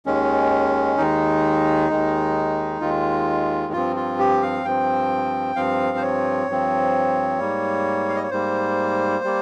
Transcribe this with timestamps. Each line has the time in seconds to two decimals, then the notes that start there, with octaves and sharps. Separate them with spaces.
0.06 D#2 D#3 G#3 C#4
0.97 D#2 D#3 G#3 D#4
1.90 D#2 D#3 G#3
2.81 D#2 D#3 G#3 F4
3.73 G2 F3 C4 F4
3.96 F4
4.19 G4
4.42 F5
4.64 G2 F3 C4 G5
5.56 G2 F3 C4 F5
5.97 C5
6.02 C#5
6.47 G2 F3 C4
7.39 G#2 G3 A#3
8.09 F5
8.16 D#5
8.23 C#5
8.31 G#2 G3 A#3 C5
9.24 G3 A#3